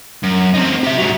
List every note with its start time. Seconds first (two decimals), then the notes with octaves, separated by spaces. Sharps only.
0.23 F#2
0.54 C4 D#4
0.84 G4 E5
0.98 G#2 F#3